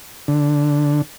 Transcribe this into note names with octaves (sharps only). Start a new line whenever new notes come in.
D3